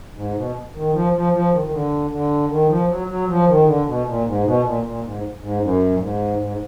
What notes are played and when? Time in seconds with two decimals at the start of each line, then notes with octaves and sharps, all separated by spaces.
0.15 G#2
0.35 B2
0.74 D#3
0.93 F3
1.13 F3
1.33 F3
1.52 D#3
1.64 D#3
1.71 D3
2.10 D3
2.50 D#3
2.68 F3
2.87 F#3
3.08 F#3
3.27 F3
3.47 D#3
3.65 D3
3.85 B2
4.05 A#2
4.24 G#2
4.44 B2
4.63 A#2
4.83 A#2
5.02 G#2
5.41 G#2
5.60 F#2
5.92 A#2
5.99 G#2
6.38 G#2